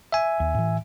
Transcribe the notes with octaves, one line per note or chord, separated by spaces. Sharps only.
E5 G#5
D#2
A2 E3